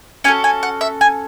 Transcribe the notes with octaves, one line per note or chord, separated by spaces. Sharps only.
C#4 F#4 A4 G#5
G#5
F#5
E5
G#5